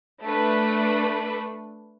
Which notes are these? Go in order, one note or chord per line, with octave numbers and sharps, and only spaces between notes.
A3 D4 B4